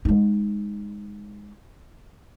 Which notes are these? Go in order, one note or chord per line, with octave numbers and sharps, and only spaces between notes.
G#3 D#4